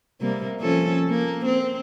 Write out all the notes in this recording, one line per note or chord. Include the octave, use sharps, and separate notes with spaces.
C3 G3 A#3
F3 C#4 A4
A#3
C4